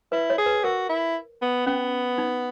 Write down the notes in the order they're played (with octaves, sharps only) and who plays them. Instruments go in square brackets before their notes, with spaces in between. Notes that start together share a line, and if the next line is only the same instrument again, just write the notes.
[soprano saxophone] E4 [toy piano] B4
[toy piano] C#5
[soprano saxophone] G#4
[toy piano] B4
[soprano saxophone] F#4 [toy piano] A#4
[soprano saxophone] E4
B3
[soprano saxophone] B3 [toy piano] C#4
[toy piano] D#4